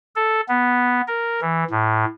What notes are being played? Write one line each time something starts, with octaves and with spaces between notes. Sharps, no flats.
A4
B3
A#4
E3
A2